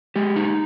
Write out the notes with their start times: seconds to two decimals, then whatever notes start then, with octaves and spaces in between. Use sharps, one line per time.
0.16 G#3 G4
0.36 D#4